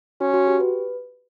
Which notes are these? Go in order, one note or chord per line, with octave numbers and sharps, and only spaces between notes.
C#4 F#4
F#4
G4
B4